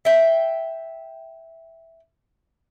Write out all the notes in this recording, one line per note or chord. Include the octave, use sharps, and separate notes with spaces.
E5 G5